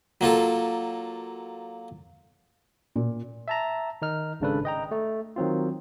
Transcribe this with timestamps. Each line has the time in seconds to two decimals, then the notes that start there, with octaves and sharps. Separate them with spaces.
0.21 F#3 A#3 F4 A4
2.96 A#2
3.48 E5 A5 A#5
4.02 D#3 D#4 F6
4.40 G#1 G#2 C#3 D4 A4 B4
4.65 D#5 G5 A#5
4.91 A3
5.36 D#3 F#3 C4 F4